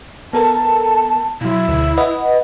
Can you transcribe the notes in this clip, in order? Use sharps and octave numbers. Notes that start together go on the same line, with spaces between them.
B3 A4 A#4 A5
B2 F#3 E4
D2 B2
B4 D#5 F#5